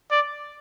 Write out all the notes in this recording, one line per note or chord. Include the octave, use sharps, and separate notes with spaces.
D5